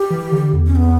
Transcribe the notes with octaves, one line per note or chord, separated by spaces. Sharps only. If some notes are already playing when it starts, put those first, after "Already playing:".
Already playing: G4
E3
D3
E2
C#4
B3